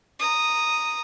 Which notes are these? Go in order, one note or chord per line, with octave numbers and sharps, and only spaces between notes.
A#5 D#6